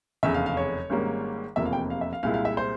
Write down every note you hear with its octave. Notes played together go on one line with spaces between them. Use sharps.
F1 E2 C#3 E5
F5
F5
C#5
G#1 G#2 G3 A#3 C#4
F1 E2 C3 F3 A#3 E5
F5
G5
F5
E5
F5
C2 A#2 G#3 E4 F5
F5
E5
C5